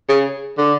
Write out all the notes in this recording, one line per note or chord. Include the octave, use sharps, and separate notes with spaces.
C#3
D3